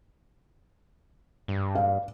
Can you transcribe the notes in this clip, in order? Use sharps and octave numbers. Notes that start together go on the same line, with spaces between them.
G2
F5